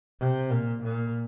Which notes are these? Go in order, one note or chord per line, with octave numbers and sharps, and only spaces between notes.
C3
A#2
A#2